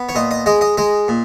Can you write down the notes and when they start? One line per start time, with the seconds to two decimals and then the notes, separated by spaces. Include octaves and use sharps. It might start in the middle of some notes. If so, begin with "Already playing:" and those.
Already playing: B3
0.09 C#5
0.15 A#2 D#5
0.31 D#5
0.46 G#3 D#5
0.61 D#5
0.77 G#3 D#5
1.08 A#2